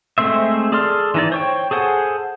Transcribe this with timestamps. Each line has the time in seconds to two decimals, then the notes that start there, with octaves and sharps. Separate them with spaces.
0.18 G#3 A3 C4 C5 E5
0.72 G#4 A4 D5 C6 F6
1.14 E3 D#4 D5
1.32 C5 C#5 G5
1.71 G#4 A4 C5 F#5 G#5